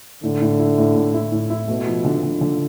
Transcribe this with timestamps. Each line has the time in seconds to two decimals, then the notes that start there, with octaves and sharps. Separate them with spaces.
0.23 A2 D3
0.42 A2
0.59 E4
0.78 A2
0.96 A2
1.14 E4
1.32 A2
1.50 E4
1.68 B2 A3
1.87 F3
2.05 D3
2.23 D3
2.41 D3